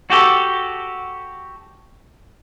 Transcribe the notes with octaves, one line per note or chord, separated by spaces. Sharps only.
F#4 G4 A4